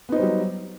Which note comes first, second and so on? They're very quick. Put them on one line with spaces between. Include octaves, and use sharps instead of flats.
B3 D#4 C5 G3 F#3